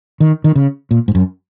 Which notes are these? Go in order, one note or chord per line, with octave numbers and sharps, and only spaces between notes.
D#3
D#3
C#3
A#2
G#2
F#2